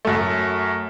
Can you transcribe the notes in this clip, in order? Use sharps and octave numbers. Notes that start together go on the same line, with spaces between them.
F#2 A3